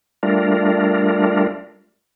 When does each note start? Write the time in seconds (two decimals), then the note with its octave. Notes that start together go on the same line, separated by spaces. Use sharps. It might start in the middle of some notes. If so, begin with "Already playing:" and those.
0.23 G3 A3 D4 F4 A#4